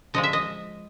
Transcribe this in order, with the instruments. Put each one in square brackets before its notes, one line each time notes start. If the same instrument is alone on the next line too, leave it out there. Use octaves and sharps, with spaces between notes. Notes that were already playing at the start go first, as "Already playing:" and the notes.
[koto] D3 F3 G#3 D#5
E5
D#5